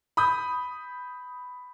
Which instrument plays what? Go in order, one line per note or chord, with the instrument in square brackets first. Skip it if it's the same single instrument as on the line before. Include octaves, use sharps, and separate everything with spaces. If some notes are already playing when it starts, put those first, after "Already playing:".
[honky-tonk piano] B5 D#6 G6